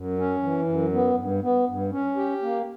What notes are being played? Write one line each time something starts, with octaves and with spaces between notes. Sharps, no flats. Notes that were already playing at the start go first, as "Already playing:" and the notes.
Already playing: F#2
C#4
E3
F#2
B3
G2
B3
G2
C#4
G4
A#3